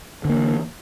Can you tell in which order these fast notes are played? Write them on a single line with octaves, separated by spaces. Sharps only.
D3 A#3 E3